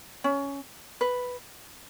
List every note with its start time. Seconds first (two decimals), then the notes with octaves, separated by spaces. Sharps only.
0.24 C#4
1.01 B4